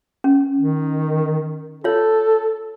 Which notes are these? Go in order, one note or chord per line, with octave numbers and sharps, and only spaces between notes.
C#4
D#3
F4 A4 C#5